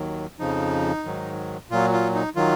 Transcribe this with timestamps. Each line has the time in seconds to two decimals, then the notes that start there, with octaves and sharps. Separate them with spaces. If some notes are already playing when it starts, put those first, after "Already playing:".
Already playing: D#2 D#3 F#3
0.39 F2 C#3 F3 D#4
1.05 G#2 D#3 F#3
1.70 A#2 F#3 F4
1.93 F4
2.14 D#4
2.36 D#3 F#3 F4